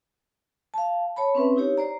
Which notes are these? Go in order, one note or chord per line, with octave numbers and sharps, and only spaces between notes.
F5 A5
C#5 A5 B5
C4 C#4 B4 E5
D#4 E4 G4 C#5
C5 D5 A#5